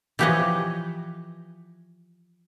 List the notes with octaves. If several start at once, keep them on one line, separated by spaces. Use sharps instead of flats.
E3 F3 G4 B4 C#5 D#5